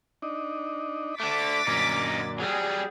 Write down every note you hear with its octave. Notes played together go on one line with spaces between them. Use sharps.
D4 D#4
D3 A3 D6 A6 B6
F#2 A#2 D3 C#4 D#4
F#3 G3 G#4